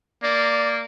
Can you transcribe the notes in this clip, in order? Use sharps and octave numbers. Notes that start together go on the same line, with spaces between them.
A#3 D5